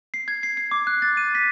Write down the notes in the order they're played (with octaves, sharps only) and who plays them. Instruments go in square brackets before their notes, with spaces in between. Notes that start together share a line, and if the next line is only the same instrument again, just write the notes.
[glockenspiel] C7
G#6
C7
C7
D6
F#6
A6
D#7
B6